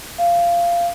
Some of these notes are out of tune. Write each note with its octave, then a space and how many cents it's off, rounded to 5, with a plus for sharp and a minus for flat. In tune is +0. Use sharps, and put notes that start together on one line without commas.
F5 -15